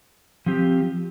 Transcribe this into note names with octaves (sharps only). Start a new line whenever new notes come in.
F3 C4 G4